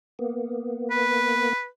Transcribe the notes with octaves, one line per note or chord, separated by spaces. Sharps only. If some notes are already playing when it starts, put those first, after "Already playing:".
A#3 B3
B4